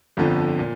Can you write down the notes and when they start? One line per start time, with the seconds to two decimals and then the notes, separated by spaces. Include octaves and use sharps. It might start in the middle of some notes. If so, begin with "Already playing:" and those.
0.17 G1 F2 D3 F3
0.59 A#2